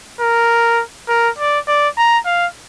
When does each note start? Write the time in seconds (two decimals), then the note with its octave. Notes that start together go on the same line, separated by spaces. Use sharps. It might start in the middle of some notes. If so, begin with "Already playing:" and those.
0.20 A#4
1.08 A#4
1.38 D5
1.68 D5
1.97 A#5
2.26 F5